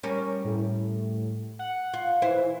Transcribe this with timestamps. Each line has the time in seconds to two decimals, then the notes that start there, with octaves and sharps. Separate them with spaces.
0.03 G3 C#4 A#4
0.45 A2
1.59 F#5
1.93 F4
2.22 E3 E4 C5